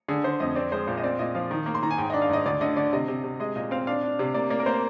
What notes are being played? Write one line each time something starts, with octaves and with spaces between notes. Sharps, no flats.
D3 G#4
D3 C5
F2 D#5
C4 D5
G#3 C5
A#2 C5
D#5
C4 D5
A#2 D#5
F3 F5
D#3
A#3
C6
D#3 A#5
G#5
G#2 G5
D#5
D4
F5
G#2 D#5
D2 D5
D3 D#5
D3 D5
C3 D#5
C3
C3
G#3 D#5
A#2 D#5
C4 F5
D4 F5
D4
C3
A#3 D5
A#3 D5
A#4
A#3 C5